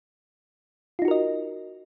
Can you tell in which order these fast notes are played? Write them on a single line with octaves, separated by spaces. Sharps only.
F4 D#4 F#4 A#4 D#5